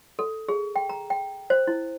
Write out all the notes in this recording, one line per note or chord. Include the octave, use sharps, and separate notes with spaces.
A4
G#4
G5
A#5
G5
C5
E4